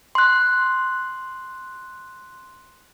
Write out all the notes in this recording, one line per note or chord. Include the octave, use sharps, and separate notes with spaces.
C6 F#6